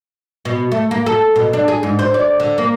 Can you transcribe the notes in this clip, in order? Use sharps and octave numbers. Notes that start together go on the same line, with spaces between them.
B2
A3
A#3
A4
B2
D4
G#4
G#2
C5
D5
D3
A#3